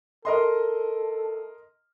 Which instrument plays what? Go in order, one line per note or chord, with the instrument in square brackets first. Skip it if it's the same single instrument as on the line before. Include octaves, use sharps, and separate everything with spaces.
[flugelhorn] A4 [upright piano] A#4 D#5 C6